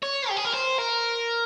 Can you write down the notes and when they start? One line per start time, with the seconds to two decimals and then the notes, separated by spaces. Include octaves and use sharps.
0.02 C#5
0.29 G4
0.37 G#4
0.45 A#4
0.54 C5
0.79 A#4